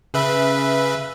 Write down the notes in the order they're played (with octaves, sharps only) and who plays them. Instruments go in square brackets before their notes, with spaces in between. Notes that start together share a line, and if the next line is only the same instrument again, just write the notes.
[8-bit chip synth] C#3 B4 E5